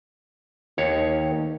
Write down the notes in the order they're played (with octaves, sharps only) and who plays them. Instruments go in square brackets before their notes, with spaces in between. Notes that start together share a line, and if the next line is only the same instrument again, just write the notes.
[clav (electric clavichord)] D#2 C#5 [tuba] D#3